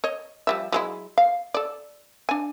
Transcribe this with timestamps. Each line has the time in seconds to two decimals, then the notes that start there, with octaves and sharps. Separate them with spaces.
0.04 C#5 D#5
0.47 F3 G3 E5
0.72 F#3 G#3 E4
1.18 F5
1.54 A4 D5
2.29 D4 G#5